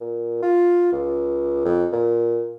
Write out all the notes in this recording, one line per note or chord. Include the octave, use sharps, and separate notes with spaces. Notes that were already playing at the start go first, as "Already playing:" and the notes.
A#2
F4
C#2
F2
A#2